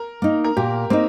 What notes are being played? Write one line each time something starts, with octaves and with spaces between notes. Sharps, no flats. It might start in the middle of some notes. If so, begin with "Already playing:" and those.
Already playing: A#4
A#3 D#4
A#4
A#2 G4
A#3 C4 D#4